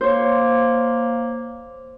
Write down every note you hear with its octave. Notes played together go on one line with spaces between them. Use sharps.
A#3 C5 C#5